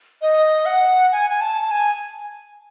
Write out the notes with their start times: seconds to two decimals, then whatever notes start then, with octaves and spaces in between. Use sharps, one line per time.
0.22 D#5
0.66 F#5
1.12 G#5
1.30 G#5
1.41 A5
1.61 A5
1.71 G#5